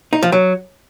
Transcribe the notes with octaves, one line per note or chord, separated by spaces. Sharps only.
D#4
F3
F#3